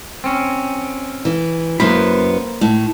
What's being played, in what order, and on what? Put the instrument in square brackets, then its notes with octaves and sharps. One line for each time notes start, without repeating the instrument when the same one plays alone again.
[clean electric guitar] C4 C#4
[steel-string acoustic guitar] E3
[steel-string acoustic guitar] F#2 B3 [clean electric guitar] A#3 C5 B5
[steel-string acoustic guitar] A2